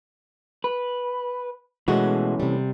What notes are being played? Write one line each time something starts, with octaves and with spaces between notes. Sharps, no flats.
B4
B2 E3 G#3 A3 C#4 F#4
C3 G3